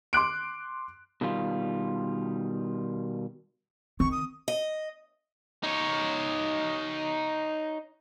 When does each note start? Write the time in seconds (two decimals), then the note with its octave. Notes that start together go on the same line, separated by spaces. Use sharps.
0.13 C6 D6 F#6 D7
1.21 B2 D#3 G3 F4
4.00 D#3 C4 C#6
4.12 D#6
4.48 D#5
5.64 D#4 C#5